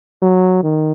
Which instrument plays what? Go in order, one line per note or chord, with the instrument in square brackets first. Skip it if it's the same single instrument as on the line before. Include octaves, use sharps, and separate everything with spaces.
[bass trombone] F#3
D#3